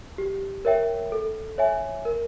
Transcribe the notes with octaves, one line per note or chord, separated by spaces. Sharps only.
G4
A#4 C#5 E5 G5
A4
C#5 E5 G#5
A#4